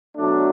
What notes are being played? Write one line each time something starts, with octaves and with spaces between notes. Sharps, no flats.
B2 F#3 A3 D4